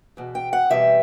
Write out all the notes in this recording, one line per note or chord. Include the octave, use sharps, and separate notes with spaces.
E2 B2
G5
F#5
E2 B2 G3 C4 E5